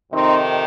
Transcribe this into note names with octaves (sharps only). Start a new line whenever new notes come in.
F2 C3 D#3 C4 D#4